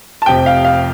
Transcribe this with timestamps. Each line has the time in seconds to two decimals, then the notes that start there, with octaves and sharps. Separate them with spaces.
0.22 A5
0.26 F1 F2 C3 F3 G5
0.46 F5
0.64 F5